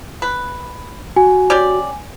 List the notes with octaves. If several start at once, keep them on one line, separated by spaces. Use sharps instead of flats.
B4
F#4 G#5
C#4 G4 D5